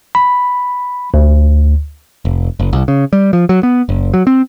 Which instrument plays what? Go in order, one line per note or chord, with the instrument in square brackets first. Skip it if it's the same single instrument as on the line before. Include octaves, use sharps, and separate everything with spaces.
[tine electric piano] B5
D2
[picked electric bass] F1
F#1
C2
C#3
G3
F3
F#3
B3
F#1
F#3
C4